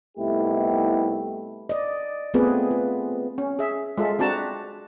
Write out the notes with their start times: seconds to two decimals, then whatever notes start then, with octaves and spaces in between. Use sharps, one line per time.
0.18 C2 A3 B3 D#4 E4 G4
1.69 D5 D#5
2.34 A3 B3 C4 F4 G#4 B4
2.71 F4
3.38 C#4
3.59 G#4 E5
3.98 G#3 F4 A4 E5
4.19 C4 D4 F#4 A5 A#5